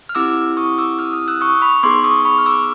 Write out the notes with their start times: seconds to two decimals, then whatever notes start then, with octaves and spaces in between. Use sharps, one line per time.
0.09 F6
0.15 C4 E4 G4 D6 E6
0.57 C#6 D#6
0.78 D6 E6
0.99 D#6 F6
1.13 D#6 F6
1.28 E6 F#6
1.41 C#6 D#6
1.62 B5 C#6
1.83 B3 D#4 G#4 C6 D6
2.04 C#6 D#6
2.25 B5 C#6
2.38 F6
2.46 D6 E6